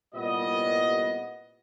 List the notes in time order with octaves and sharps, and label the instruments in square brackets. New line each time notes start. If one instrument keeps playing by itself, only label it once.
[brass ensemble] C2 A#2 G3 B3 D#5